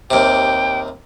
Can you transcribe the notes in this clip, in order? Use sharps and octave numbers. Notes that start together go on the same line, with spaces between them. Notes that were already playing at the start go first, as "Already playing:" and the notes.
D#2 C3 G5